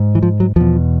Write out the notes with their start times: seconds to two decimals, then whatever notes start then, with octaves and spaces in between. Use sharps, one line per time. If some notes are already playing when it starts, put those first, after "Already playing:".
Already playing: G#2
0.15 E3
0.23 F3
0.40 F#3
0.56 E2 B2 F3